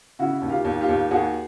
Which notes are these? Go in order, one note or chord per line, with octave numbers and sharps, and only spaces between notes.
C#3 E4 F#4
D#2
F4 G4
D#2
F4 G4
D#2
D#2 F#4 G#4